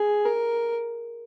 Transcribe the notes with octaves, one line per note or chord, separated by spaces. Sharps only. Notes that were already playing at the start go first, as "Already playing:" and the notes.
Already playing: G#4
A#4